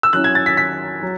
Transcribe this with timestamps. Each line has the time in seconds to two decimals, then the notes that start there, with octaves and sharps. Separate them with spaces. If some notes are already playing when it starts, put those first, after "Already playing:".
0.03 E6
0.13 F#3 C#4 E4 F#6
0.24 G#6
0.35 A6
0.46 B6
0.57 B6
1.02 F#3